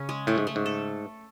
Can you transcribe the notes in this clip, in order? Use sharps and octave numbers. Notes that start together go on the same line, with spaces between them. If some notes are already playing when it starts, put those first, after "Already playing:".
Already playing: C#3 C#4
G#3
A2 A3
G#2
A3
G#2
A4